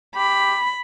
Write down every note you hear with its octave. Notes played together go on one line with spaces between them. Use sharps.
G4 B5